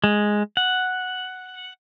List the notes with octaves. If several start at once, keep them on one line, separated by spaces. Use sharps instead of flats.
G#3
F#5